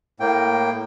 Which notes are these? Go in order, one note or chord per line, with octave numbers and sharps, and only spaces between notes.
A2 A#3 G5